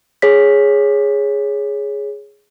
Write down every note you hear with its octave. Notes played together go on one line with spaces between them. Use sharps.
G#4 C#5 B6